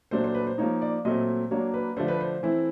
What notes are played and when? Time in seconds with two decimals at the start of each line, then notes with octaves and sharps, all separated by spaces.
0.11 A#2 F#3 A3 D4 C5
0.24 C5
0.34 B4
0.47 C5
0.58 F3 A#3 D#4 C#5
0.82 D5
1.05 A#2 F#3 A3 C4 D#5
1.51 F#3 A#3 D4 C#5
1.74 B4
1.96 D3 F3 A3 D4 C5
2.08 B4
2.21 C5
2.43 E3 A3 C4 E4